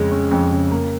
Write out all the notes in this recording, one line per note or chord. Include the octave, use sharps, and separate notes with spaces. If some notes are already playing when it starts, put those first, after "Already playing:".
Already playing: F2 C#3 G#3 C#4
C#4
F2
C#3
A#3